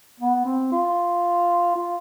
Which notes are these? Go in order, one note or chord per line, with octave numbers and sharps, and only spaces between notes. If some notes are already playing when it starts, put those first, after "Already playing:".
B3
C4
F4
F4